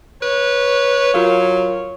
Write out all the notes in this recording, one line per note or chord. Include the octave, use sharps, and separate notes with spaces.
B4 C#5
F#3 F4 A#4 F5